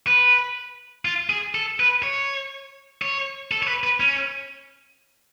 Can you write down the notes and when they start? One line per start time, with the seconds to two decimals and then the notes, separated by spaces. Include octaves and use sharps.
0.07 B4
1.05 F4
1.30 G#4
1.55 A4
1.80 B4
2.03 C#5
3.02 C#5
3.51 A4
3.63 C#5
3.68 B4
3.84 B4
4.00 C#4